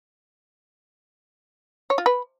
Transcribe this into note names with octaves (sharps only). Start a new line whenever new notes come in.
C#5
F4
B4